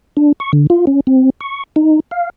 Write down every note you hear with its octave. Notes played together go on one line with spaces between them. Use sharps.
D4
C#6
D3
F4
C#4
C4
C#6
D#4
F5